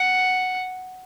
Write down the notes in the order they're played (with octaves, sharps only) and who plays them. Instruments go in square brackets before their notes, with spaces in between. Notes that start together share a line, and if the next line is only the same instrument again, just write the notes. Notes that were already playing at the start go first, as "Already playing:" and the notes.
Already playing: [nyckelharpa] F#5